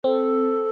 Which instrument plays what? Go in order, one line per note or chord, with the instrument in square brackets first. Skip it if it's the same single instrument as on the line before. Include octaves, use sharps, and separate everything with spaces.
[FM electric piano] C4 [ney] A4